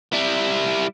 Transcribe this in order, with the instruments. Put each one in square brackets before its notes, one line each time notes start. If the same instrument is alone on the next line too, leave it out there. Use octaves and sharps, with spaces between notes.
[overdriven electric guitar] G3 E4